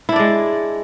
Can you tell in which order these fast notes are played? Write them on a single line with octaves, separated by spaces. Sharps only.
E4 D4 D5 G#3